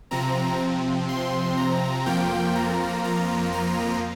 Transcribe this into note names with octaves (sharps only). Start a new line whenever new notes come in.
C3 F3 C4 A#5
C6
A#5
F2 F3 A#3 F4 G5
A#5
A#5
A#5